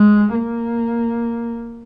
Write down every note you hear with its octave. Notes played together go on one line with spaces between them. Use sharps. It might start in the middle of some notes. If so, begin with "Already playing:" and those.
Already playing: G#3
A#3